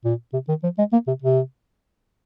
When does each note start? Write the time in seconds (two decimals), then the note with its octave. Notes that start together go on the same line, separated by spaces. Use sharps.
0.04 A#2
0.33 C3
0.48 D#3
0.63 F3
0.78 G#3
0.93 A#3
1.07 C3
1.22 C3